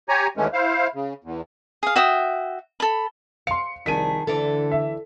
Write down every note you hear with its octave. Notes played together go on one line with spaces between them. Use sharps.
G4 C#5 G#5 A#5
D#2 E3 G#3 A3 C#4
E4 C5 F5
C#3
E2
G#4 F5
F#4 E5 G5 D#6
A4 B5
F5 C6 C#7
C2 F2 D#3 D4 G#4 B6 D#7
D2 D3 E3 D4 A4
E5